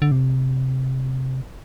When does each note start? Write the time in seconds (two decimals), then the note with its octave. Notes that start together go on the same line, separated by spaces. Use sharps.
0.02 D3
0.12 C3